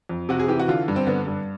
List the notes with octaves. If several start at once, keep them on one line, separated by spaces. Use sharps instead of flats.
F2
C3 F#4
G#4
E3 G4
F#4
D3 F4
G2
C4
D3 B3
G2